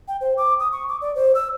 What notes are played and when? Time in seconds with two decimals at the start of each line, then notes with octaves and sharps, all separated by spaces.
0.08 G5
0.21 C5
0.37 D6
0.60 D#6
0.72 C#6
0.88 D6
1.02 D5
1.15 C5
1.35 E6